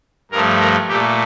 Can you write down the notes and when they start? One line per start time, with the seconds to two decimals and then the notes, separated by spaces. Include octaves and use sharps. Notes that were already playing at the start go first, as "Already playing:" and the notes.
0.32 G2 F3 A3 A#4
0.59 A#4
0.88 A#2 A3 G4